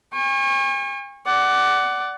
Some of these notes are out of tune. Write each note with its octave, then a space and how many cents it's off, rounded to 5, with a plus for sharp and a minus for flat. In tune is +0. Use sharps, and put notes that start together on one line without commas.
G#5 -45 C#6 -25
D5 -5 F#5 +20